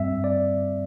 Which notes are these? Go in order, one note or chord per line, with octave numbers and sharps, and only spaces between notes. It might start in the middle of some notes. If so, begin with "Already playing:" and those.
Already playing: G2 G3 C4 E5
D5